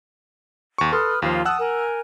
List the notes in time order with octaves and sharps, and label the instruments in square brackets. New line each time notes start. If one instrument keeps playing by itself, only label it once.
[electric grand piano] D#2 C#6
[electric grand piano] A4 C6 [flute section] B4 D#6 F6
[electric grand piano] D#2 F3 [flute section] F4 F5
[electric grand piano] F#5 E6 F#6 [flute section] A5 D#6
[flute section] A#4 G#5